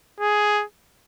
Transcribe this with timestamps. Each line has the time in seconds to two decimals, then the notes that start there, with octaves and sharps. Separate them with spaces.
0.20 G#4